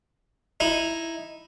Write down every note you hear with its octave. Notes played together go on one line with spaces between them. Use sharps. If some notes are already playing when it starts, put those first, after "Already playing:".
D#4 E4